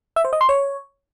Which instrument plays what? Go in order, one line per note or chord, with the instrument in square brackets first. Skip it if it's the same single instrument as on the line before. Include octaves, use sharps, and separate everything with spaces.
[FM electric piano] E5
C5
D#5
C6
C#5